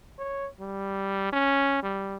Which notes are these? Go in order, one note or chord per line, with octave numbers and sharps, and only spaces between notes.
C#5
G3
C#4
G3